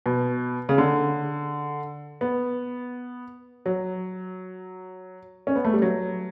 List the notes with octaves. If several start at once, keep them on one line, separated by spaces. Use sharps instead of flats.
B2
C#3
D3
B3
F#3
C#4
B3
A3
G3
F#3